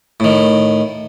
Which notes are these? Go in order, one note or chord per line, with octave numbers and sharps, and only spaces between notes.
A2 D#3